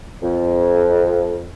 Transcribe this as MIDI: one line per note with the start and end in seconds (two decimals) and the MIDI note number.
0.23 1.51 41